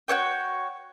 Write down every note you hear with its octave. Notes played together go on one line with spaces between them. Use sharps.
F#4 C5 C#5 G5